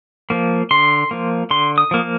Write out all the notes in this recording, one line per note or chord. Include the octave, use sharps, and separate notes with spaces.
F3 A#3
D3 C6
F3 A#3
D3 C6
D#6
F3 A#3